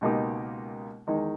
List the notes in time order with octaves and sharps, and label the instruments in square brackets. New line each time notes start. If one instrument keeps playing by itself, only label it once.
[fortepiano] C#2 B2 A#3 D#4 G4
E2 D#3 G#3 D#4